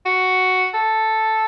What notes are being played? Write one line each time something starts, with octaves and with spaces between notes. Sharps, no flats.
F#4
A4